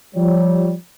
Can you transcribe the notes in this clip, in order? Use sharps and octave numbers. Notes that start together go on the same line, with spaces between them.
F3 G3 C#5